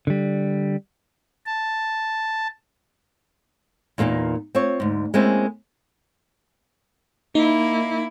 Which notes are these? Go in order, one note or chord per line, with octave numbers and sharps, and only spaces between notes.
D3 G3
A5
E2 A#2 A#3 C4 D#4
C4 F4 C#5
D2 G#2
G#3 A#3 C4 C#4 E4
A#3 D#4 E4